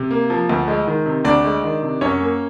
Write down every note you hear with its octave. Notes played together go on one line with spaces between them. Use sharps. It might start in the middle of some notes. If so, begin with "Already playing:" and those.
Already playing: C3
A#3
F3
D2
G#3
D#3
C3
D2 D4 D5
G#3
D#3
C3
F#2 C#4 C#5
A#3